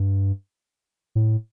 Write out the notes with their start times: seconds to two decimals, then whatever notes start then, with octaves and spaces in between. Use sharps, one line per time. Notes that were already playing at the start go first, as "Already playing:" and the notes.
Already playing: G2
1.15 A2